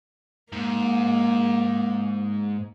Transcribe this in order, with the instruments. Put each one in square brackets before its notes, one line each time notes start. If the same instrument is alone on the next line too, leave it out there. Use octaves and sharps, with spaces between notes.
[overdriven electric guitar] G#2 [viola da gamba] A#3